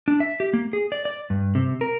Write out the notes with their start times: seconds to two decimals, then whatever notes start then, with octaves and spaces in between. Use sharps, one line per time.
0.08 D4
0.20 E5
0.40 G4
0.53 A#3
0.73 G#4
0.92 D5
1.05 D5
1.30 G2
1.55 C3
1.81 A#4